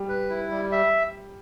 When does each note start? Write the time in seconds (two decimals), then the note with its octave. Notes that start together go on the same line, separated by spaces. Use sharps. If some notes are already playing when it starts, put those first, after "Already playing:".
Already playing: G3
0.09 B4
0.30 E4
0.51 G3
0.72 E5